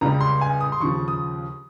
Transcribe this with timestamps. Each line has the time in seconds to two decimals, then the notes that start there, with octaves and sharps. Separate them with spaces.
0.01 C#2 C#3 G3 A#5
0.21 C6
0.41 G#5
0.61 D#6
0.72 C6
0.80 D#2 C#3 F3 C#6
1.08 D#6